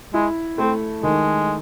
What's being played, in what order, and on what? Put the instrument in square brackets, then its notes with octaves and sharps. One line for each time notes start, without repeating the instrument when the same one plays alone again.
[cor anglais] G#3 [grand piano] E4
[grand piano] A3 [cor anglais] C4
[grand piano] D#3 [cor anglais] G#3